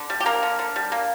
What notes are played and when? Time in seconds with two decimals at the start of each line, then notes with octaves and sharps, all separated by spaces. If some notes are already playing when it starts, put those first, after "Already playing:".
Already playing: D3
0.10 G3
0.20 G4
0.26 A#3 A#4
0.43 D3
0.59 D3
0.76 G3
0.92 A#3